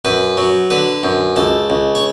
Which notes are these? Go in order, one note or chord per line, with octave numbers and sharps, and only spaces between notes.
F#2 B4
F#3
D3 B4
F#2
C#2 A4
C#2
C#5